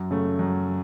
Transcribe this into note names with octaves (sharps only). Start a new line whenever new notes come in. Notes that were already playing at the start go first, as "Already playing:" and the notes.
Already playing: F#2
C#3 A3
F#2